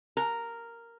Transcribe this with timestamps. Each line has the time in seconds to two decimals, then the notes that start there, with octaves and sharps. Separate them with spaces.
0.17 A#4